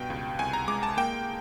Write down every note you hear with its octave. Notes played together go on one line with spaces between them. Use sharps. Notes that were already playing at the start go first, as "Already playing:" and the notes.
Already playing: G2 B2 G5
C#2
C2 G#5
A#5
G#3 D6
A5
A#3 G5